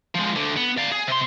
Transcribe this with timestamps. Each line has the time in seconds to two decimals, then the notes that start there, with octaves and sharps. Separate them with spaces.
0.15 F3 G#3
0.35 D2 D3
0.57 B3
0.78 D5 F5
0.92 G#4
1.07 C3 C6